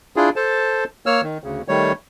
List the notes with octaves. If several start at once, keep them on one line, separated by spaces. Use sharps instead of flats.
D4 E4 F4 G#4
A4 C5 A5
A#3 C#5 E6 F6
D#3
D2 C#3
D#3 G3 A3 C#5